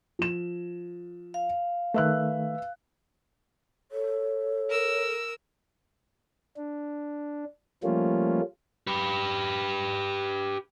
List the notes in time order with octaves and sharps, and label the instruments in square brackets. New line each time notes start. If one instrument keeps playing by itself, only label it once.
[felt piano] F3 E7
[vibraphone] F5
[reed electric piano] D#3 A3 [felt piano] B4 E5 F#6
[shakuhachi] A4 [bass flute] C#5
[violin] A#4 E6
[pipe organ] D4
F3 G3 A3 A#3 C#4 F4
[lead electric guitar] G4 B4